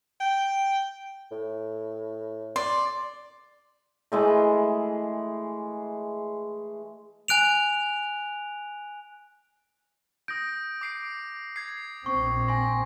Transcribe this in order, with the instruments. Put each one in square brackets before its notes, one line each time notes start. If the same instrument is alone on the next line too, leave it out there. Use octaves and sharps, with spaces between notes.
[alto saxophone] G5
[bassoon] A2
[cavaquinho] D5 [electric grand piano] C6
[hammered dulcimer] E3 G#3 A3
[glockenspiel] G#5 F#6 D7 F7
[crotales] D#6 A#6 D7 [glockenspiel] G6
[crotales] D6 C7 D7
G#6 C7
[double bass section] A#1 C4 [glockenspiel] C#6
[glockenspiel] G#5 C6 [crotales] A#6